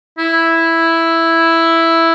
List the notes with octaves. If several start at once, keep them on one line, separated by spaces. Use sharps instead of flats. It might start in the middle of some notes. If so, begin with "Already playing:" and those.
E4